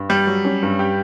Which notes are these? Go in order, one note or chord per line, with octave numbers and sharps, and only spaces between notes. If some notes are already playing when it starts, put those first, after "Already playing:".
Already playing: G2
G3 G4
F#3
C#4
G2
G4